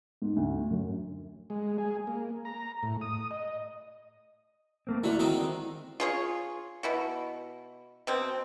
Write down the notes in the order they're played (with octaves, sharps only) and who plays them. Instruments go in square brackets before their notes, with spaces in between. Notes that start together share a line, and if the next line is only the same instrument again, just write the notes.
[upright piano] G#2
D2
F#2
[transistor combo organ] G#3
G#4
A#3
A#5
A2
D#6
D#5
[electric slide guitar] A3 A#3 C4
[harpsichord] D3 F#3 [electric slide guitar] E4 F#4
[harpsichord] D#3 G#3 C4
[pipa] F4 G#4 C#5
B2 E4 F#4
B2 C4